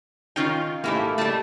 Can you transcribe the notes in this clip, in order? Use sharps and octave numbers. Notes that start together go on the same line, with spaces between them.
D#3 C#4 D#4 F4 G5
G#2 A3 A#3 E4 G4
G3 A3 A5 D6